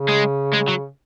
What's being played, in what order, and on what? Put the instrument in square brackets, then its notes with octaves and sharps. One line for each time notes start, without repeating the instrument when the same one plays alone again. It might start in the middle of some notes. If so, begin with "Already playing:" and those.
Already playing: [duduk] C#3
[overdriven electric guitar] G#3
G#3
F#3